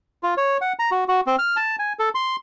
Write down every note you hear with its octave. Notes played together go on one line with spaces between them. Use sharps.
F4
C#5
F#5
A#5
F#4
F#4
C4
F6
A5
G#5
A4
C6